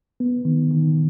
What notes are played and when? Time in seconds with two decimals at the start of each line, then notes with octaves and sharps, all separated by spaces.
0.20 B3
0.45 D#3
0.71 D#3